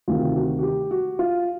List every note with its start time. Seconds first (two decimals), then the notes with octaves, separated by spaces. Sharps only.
0.08 D2 C3 D#3 F4
0.36 F#4
0.59 F#4
0.63 G4
0.91 F#4
1.19 F4